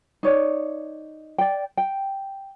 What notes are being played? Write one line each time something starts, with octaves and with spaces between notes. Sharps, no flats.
D#4 C#5 D5
D5 G5
G5